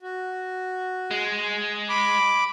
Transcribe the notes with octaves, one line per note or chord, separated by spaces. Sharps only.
F#4
G#3
B5 D6